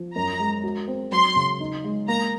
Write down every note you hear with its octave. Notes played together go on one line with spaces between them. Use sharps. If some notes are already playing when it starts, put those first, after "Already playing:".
Already playing: F3
F#2 A#5
G#3
F#4
C4
F#3 C6
C#3
D#4
G#3
A#3 A#5